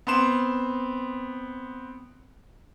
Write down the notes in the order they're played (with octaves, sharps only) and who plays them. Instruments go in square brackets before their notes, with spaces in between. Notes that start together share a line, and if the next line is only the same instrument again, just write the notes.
[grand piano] B3 C4 C6 E7